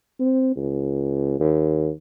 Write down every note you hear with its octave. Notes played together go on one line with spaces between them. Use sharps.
C4
C#2
D#2